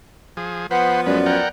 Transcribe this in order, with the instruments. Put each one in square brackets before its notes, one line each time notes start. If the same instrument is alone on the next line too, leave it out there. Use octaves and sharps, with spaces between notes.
[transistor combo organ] F3 G#4
[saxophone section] F3 B3 [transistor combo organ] B4 C5 [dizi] F#5
[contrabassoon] F#2 [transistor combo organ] G#3 B4 [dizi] D5
[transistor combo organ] A#4 F#5 G5